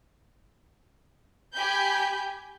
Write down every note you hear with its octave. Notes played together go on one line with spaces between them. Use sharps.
G4 G#5 B5 G6